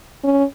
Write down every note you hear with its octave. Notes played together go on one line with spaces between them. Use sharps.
C#4